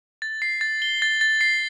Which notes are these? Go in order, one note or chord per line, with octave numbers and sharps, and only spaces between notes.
A6
C7
A6
G7
A6
A6
C7